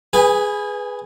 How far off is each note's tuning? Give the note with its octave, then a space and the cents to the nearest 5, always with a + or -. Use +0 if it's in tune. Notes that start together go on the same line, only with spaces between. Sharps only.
G#4 +0 B4 +0 G#5 -35